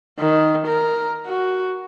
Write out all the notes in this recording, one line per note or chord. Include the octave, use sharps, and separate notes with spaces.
D#3
A#4
F#4